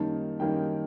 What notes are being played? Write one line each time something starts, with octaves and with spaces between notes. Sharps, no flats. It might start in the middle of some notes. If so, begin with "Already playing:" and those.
Already playing: F#2 D#3 G3 A#3 D#4 A5
F#2 D#3 G3 A#3 D#4 G5